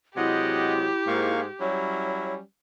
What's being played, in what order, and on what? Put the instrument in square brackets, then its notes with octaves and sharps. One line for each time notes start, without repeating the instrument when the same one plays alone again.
[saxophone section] C3 F#3 G#3 [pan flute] E4 [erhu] G4 [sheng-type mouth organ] D#5 F#5
[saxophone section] G#2 [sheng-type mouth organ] A#3 F5 C#6
[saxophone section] F#3 G3 C#4 [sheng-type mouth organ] E4 [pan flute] C#5